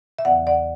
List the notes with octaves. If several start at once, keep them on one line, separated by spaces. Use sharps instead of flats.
E5
E2 C#3 E3 B3 D5 F#5
D5 F#5